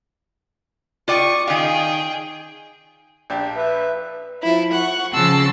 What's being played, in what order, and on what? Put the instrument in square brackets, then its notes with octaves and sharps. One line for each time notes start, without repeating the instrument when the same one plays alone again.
[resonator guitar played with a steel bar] F4 D5 G5 [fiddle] C#6 D#6
[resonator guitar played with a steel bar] D#3 F5 [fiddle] G#4 G5
[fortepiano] A#1 D4 G4
[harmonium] B4 E5
[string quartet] F3 E4
F#5 C#6
C#3 F3 A5 C6 E6